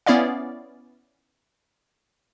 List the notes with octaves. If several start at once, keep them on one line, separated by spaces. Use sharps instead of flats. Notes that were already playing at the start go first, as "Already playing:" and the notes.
B3 C#4 E4 D5 F5